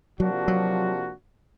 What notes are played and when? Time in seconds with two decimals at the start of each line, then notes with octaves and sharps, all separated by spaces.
0.19 C3 F3 F#3 A#3 D4 F#4
0.48 F#3